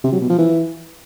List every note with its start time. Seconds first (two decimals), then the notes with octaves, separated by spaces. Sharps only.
0.04 C3
0.13 F#3
0.21 B2
0.30 F3
0.38 E3